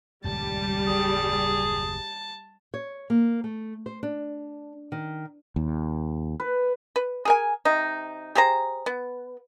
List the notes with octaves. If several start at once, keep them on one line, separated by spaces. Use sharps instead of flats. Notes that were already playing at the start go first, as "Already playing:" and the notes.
D#1 C#2 G2 G3 A5
F#1 D#2 A2 G#4
C#5
A#3
A3
C5
D4
D#3
D#2
B4
B4
G#4 A#4 G#5
C3 D#4
G4 G#4 C5 A#5
B3